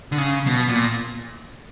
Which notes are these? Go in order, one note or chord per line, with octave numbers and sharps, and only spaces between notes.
D3
C#3
B2
A#2